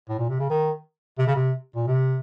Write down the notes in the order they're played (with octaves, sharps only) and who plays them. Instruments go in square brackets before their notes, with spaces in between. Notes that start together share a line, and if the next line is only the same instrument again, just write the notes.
[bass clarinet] A2
A#2
C3
C#3
D#3
C3
C#3
C3
A#2
C3